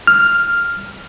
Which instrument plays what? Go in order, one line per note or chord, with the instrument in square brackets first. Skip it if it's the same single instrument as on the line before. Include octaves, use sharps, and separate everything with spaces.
[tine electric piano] F6